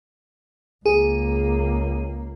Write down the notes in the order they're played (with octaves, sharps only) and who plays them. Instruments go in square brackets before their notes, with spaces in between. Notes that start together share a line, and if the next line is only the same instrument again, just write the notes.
[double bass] C#2 A#3 [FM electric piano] G#4